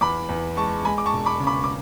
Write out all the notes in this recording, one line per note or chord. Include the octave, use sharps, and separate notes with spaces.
E2 B5 D6
E2
G#3 A5 C#6
G#3 G#5 B5
D6
A5 C#6
E1
B5 D6
C#3
B5 D6
D6